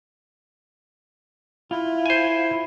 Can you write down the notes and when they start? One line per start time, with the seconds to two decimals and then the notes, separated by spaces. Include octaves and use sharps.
1.71 E4 F4
2.06 C5 G#5